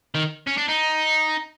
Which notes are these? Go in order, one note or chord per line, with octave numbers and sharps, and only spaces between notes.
D#3
C#4
D4
D#4